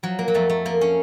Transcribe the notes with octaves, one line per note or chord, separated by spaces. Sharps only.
F3 F#3
A#3
F#3
F2 A3
A3
F3 A#3
C#4